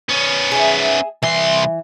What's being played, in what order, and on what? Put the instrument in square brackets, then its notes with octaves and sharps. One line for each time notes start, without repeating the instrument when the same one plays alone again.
[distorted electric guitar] B3 C#4
[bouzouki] G#4 E5
[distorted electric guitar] C2 C6 [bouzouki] E3